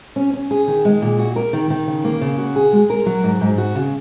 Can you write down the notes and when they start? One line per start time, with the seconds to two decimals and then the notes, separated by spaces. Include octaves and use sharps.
0.16 C#4
0.33 C#4
0.51 G#4
0.68 D#3
0.85 G#3
1.02 A#2
1.19 F#4
1.36 A#4
1.53 D#3
1.70 D#3
1.87 C#3
2.04 A#3
2.21 C#3
2.38 F#4
2.56 G#4
2.73 G#3
2.90 A#4
3.06 F#3
3.24 G#2
3.41 G#2
3.58 F#4
3.75 C#3